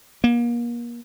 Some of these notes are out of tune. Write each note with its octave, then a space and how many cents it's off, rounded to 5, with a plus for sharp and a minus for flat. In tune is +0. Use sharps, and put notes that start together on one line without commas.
A#3 +35